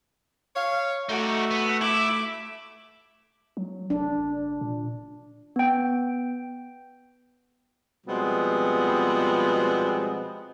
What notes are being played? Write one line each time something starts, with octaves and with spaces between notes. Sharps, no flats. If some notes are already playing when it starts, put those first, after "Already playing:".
C#5 F5
A3 D#4 F#4 D5
B3
E4 E5 D6
F#3
F1 D4
A#2
B3 G5
B2 F3 G3 G#3 B3 C4